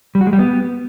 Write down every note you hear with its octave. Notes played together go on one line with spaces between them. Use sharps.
G3
F#4
G#3
G3
B3